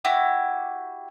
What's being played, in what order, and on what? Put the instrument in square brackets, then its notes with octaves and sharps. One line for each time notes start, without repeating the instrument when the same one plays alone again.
[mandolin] E4 F#4 G4